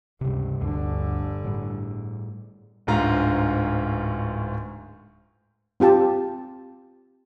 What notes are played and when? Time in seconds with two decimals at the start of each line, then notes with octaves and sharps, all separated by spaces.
0.21 C#2 G2 C3
0.61 G1 D2 G2 D3 D4
1.44 A2 G3
2.87 D1 D2 G#2 F4 A#5
5.80 C4 F4 G4 A5